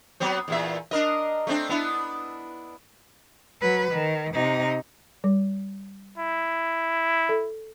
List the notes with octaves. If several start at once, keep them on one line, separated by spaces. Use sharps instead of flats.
F#3 B3 C4
E2 A#2 E5
D4 A#4 D#5
A3 C4 D4
B3 D4 E4
F#3 B4
D#3
C3 D#4
G3
E4
A4